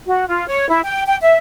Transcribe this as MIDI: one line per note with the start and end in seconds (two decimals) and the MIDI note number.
0.06 0.24 66
0.27 0.45 65
0.47 0.68 73
0.69 0.81 64
0.83 1.03 79
1.07 1.16 79
1.22 1.38 76